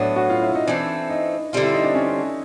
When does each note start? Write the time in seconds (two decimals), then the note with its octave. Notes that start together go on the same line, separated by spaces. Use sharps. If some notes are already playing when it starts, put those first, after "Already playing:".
Already playing: A2 F#3 B3 D4
0.16 F#4
0.30 F4
0.42 E4
0.55 D#4
0.67 E3 A3 C4 D4
1.10 D#4
1.53 D3 G3 C4 F4
1.62 E4
1.74 D#4
1.84 D4
1.95 C#4